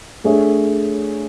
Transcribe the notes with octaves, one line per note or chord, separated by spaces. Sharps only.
A3 D4 G#4 C#5 E5